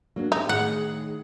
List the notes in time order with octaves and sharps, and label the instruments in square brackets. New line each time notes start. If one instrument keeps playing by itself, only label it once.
[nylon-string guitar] F#3 A#3 D4
[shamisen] D#4 [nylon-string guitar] F4 G4
[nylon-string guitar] A2 D#3 [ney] G#4 [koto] F#5